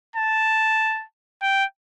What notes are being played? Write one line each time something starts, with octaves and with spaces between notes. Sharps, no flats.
A5
G5